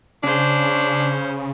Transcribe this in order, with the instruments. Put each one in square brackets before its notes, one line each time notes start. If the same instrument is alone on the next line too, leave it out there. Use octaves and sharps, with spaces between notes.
[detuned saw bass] C#3 [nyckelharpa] C#4 C5 [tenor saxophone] D4